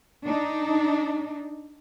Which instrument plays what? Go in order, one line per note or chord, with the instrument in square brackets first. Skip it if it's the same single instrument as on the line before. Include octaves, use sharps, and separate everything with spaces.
[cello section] D4 D#4